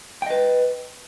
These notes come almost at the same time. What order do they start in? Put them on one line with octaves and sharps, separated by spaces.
G5 D#5 B4